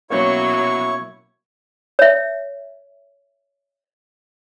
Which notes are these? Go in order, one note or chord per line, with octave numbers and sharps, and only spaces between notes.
B2 F#3 A#3 C#4 E4 C#5 C#6
C#5 E5